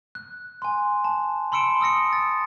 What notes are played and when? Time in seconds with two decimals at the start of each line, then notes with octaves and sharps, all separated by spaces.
0.15 F#6
0.62 G#5 C6
1.04 A5
1.52 B5 C6 E6 C#7 D7 E7
1.81 D#6 E6 A#6 C#7
2.13 A6